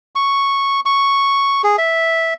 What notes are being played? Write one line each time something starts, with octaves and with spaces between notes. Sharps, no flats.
C#6
C#6
G#4
E5